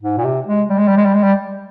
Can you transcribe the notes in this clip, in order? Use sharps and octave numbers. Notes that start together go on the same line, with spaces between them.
G#2
A#2
C3
G#3
G3
G#3
G3
G#3
G3
G#3
G3